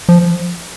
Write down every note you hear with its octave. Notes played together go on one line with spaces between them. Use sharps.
F3